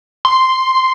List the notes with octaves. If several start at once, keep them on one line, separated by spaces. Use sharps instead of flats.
C6